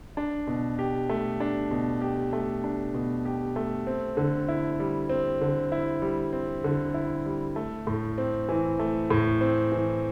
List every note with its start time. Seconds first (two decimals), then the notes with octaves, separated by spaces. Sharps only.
0.17 D4
0.47 B2
0.79 G4
1.09 A3
1.40 D4
1.71 B2
2.01 G4
2.33 A3
2.64 D4
2.94 B2
3.25 G4
3.56 A3
3.87 C4
4.17 D3
4.48 E4
4.80 G3
5.09 C4
5.41 D3
5.72 E4
6.02 G3
6.33 C4
6.64 D3
6.94 E4
7.26 G3
7.56 A3
7.87 A2
8.18 C4
8.49 E3
8.79 A3
9.10 A2
9.41 C4
9.72 E3